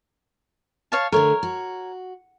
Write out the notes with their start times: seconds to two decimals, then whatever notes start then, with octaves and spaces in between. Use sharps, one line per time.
0.92 C#5 F5 A5
1.12 D3 A3 A#4 C#5
1.43 F#4